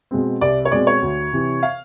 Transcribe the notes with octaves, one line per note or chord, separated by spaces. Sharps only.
B2 G#3 C4
C2 D5
C#5
B2 G#3 C4 D5
C#5
D2
C3 E3
F5